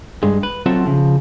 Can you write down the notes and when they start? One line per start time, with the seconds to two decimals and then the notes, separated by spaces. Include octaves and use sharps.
0.23 G2 G#3
0.43 B4
0.66 F#3 C4 F4 F#4 A4 E5
0.86 C#3 F3